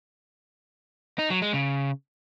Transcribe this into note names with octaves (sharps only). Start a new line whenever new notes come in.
D#4
F#3
G#3
C#3